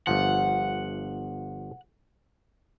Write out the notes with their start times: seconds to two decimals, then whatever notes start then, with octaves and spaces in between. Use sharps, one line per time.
0.07 G1 F3 F#5